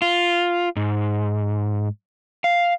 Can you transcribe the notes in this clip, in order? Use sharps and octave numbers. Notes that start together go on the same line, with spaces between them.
F4
G#2
F5